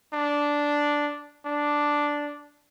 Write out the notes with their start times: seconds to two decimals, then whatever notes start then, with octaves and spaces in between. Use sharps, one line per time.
0.13 D4
1.45 D4